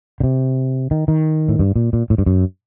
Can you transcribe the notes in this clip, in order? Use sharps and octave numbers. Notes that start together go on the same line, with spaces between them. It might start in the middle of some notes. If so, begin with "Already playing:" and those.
D3
C3
D#3
D#3
A2
G2
A#2
A#2
A2
G2
F#2